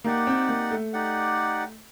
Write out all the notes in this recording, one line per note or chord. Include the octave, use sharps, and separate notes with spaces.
A#3 D#4 G4 D5 F#5
C4
A#3
A3
D#4 G4 D5 F#5